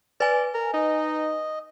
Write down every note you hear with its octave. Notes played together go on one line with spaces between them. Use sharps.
B4 D5 G#5
A#4
D#4 D#5